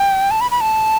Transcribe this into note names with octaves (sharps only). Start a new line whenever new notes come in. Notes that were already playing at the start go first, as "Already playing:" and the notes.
Already playing: G5
A5
B5
B5
A5